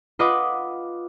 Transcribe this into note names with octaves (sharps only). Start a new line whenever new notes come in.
F4 B4 D#5 F#5 B5 D6